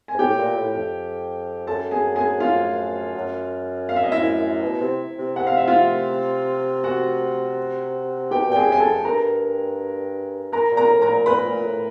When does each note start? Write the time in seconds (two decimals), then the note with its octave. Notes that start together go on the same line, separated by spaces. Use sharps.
0.08 G#5
0.14 G#2
0.19 A2 G4 G5
0.38 A#2
0.56 A2
0.74 F2
1.67 F#2 A4 A5
1.91 G#4 G#5
2.16 G#4 G#5
2.40 F4 F5
3.15 F#2
3.89 F5
3.96 E5
4.03 D#5
4.12 E4 E5
4.62 B2
4.80 C3
5.18 C3
5.36 C3 F#5
5.47 F5
5.57 E5
5.68 F4 F5
6.83 F#4 F#5
8.31 B2 G4 G5
8.49 A#2 G5
8.56 G#4 G#5
8.68 F#2 G#5
8.80 A4 A5
8.87 F2
9.04 G2 A#4 A#5
10.53 A#4 A#5
10.71 A#2
10.77 A#4 A#5
10.90 A2
11.02 A#4 A#5
11.08 A#2
11.26 A#2 B4 B5
11.45 A#2
11.63 A2